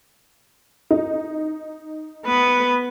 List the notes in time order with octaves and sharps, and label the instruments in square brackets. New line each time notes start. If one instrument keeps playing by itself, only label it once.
[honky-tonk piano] D#4
[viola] B3 B4